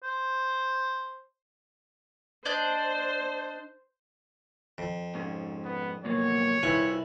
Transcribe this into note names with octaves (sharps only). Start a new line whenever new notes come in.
C5
D4 C5 D#5 G6
F2
G#2 C#4
B3
F#2 B2 A#3 C#5
C2 E4 F4 B4 G#5